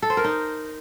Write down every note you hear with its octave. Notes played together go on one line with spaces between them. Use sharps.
A4
C5
A#4
D#4